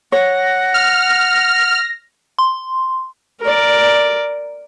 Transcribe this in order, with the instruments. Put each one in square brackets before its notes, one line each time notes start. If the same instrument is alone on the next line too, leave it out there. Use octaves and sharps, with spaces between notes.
[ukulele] C#5 [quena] F#5 [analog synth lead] A#6
[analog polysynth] F6
[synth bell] C6
[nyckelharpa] A#4 D5